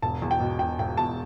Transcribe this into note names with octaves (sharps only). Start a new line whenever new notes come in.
E1 A5
E2
G5
B2
E1 G5
E1 G5
E2 A5